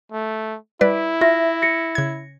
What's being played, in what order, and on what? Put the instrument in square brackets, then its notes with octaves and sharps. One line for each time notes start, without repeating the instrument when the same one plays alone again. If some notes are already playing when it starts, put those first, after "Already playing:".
[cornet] A3
[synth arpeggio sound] G3 B4 D5 [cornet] E4
[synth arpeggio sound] F4 [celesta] E5 A#6
[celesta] A#6 C#7
[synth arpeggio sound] C#3 G#6